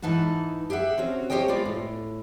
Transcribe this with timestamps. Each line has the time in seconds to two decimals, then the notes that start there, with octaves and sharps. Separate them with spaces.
0.02 G#2 E3 D#4 F#5 A5
0.70 G4 G#4 E5 F#5
0.98 C4 C#4 F#4
1.30 G4 C5 C#5 D#5 G5
1.48 G#3 B3 F4 D5
1.65 A2